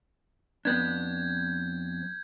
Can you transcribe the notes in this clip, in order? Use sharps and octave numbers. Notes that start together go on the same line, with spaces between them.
F2 B3 D4 G6 G#6